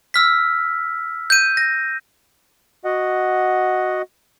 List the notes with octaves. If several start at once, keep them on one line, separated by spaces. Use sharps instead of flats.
E6 F6 B6
G6 D#7
A#6
F#4 D#5 F#5